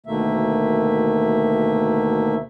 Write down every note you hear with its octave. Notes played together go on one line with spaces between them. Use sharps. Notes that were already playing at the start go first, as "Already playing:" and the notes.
D2 B2 D#3 A3 A#3 E5